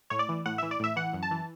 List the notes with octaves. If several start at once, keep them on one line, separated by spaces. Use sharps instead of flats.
A2 C#5
D5
E3
A2 F#5
E3 E5
D5
A2 E5
E3 F#5
F#2
A5
E3